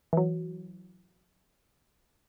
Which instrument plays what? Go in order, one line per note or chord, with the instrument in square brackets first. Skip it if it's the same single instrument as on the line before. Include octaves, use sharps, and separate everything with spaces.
[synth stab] E3 F#3